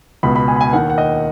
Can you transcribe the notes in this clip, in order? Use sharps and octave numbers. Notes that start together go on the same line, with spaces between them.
C#2 B2 B5
B5
G#5
B5
G#5
D#2 D#3 F#5
F#5
D#5